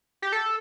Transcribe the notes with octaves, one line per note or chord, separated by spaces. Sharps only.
G4
A4